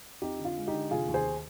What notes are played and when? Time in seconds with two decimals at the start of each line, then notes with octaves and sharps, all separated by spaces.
0.21 F2 D#4 G4
0.39 D3
0.45 F4
0.57 G#3
0.67 D#4 G4
0.74 D3
0.91 F1 F4 G#4
1.08 D#2
1.14 G#4 C5